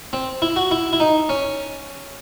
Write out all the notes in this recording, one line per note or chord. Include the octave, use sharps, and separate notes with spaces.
C4
E4
F#4
E4
E4
D#4
C#4